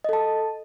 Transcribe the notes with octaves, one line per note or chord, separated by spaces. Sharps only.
A4 D#5 A5